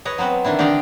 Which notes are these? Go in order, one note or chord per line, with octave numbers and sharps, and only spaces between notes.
B4 C#5 D#5
F#3 B3 C4 B4
C3 D#3 E3 D4 E4
D3 G4 D5 D#5 F5 G5